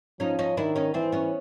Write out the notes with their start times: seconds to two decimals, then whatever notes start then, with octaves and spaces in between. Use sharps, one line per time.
0.20 F3 C#4 D#4
0.39 C#4 D#4
0.57 D#3 D4 E4
0.76 C#4 D#4
0.94 E3 C4 D4
1.12 B3 C#4